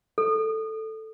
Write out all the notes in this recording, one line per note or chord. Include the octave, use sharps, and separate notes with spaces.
A4